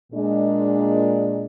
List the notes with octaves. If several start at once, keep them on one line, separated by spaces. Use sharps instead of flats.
A#2 G#3 D4